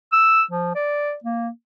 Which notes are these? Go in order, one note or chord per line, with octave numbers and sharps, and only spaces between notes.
E6
F3
D5
A#3